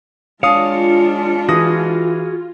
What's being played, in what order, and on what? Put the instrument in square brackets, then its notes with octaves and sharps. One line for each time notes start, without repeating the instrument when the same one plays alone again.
[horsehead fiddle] G#3 D4 [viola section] F4 [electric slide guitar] C#5 [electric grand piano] F5 D#6
[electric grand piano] E3 D#6 A#6 [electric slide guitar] F#4 G#4